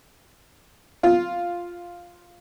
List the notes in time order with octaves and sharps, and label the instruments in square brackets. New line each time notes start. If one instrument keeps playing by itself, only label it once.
[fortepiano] F4